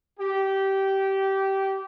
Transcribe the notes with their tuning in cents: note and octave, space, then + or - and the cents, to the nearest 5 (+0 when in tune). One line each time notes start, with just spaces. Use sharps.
G4 -15